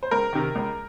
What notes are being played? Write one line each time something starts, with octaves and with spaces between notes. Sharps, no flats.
C5
C#2 A#4
C3 D#3
C#2